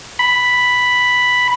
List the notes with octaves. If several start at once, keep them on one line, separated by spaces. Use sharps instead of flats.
B5